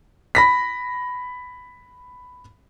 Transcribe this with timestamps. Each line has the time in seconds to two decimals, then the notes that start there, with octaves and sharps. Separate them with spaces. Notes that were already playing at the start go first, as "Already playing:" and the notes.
0.35 B5 A#6 B6